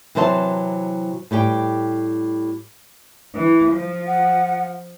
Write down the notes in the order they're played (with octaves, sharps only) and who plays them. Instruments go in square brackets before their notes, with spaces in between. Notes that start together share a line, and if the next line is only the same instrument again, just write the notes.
[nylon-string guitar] C3 E3 F#3 C5 D#5 A5
A2 G3 G4 G5
[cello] E3
F3
[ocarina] F#5